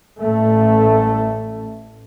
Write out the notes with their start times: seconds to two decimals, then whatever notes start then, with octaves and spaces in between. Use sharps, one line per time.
0.20 A1 A3